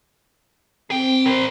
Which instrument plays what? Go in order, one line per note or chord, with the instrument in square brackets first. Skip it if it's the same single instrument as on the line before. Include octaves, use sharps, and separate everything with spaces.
[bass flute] C4 [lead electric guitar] G#4 G5
[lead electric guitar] A#4 C5